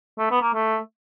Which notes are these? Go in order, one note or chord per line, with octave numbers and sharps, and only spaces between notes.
A3
B3
A#3
A3